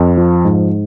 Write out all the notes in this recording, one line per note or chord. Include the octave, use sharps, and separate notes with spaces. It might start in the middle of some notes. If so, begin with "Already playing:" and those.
Already playing: F2
F3
G#2